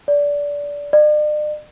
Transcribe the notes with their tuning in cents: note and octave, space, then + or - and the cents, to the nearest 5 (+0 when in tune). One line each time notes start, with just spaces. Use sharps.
D5 -20
D5 +45